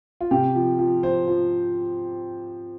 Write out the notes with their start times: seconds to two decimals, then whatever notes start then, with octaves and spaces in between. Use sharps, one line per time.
0.21 F4
0.31 C3 G4
0.55 F3
0.79 F3
1.03 F3 C5
1.27 F3